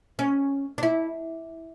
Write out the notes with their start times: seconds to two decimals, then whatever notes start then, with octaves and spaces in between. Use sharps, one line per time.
0.19 C#4
0.78 D4
0.83 E4